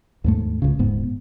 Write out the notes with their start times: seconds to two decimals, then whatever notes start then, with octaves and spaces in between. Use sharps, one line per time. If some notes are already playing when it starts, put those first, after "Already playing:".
0.24 D#2 G#2 A3
0.62 C#2 C#3
0.79 D#1 G#2 B3